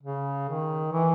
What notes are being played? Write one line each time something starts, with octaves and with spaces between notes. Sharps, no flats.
C#3
D#3
E3